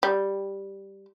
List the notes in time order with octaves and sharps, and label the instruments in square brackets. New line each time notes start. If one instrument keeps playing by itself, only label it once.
[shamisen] G3